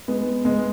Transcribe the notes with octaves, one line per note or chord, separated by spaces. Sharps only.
G#3 B3
G#3 B3